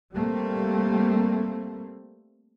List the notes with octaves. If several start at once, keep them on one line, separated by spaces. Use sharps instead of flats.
G3 A3 A#3 C4